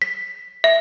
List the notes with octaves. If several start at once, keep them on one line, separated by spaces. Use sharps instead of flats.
B6
E5